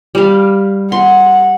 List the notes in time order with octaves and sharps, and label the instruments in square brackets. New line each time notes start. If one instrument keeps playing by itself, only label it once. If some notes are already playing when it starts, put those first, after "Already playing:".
[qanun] G3 F5
[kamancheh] F#5 [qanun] C6